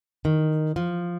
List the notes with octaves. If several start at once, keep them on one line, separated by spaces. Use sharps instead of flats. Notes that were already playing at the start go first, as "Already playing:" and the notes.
D#3
F3